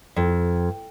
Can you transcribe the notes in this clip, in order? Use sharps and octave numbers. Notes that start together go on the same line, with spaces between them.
F2